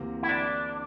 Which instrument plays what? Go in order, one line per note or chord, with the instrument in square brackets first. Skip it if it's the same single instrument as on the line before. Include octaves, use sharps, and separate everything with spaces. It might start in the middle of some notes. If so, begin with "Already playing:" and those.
Already playing: [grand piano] D2 C3 E3 A#3
[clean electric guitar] E4
D4